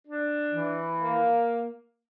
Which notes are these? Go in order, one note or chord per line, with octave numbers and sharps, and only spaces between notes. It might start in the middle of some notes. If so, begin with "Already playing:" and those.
D4
E3
A#3